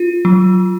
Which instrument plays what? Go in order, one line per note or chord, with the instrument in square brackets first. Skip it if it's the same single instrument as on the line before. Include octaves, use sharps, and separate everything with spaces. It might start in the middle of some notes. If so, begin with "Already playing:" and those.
Already playing: [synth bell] F4
F#3